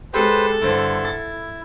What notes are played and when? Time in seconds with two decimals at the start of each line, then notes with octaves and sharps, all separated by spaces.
0.14 G#3 G4 A4 B4 C5
0.62 G2 D3 E4 C5
1.05 A6